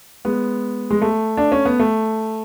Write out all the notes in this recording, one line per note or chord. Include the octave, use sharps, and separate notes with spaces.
G#3 B3
G#3
A3
D4
C#4
B3
A3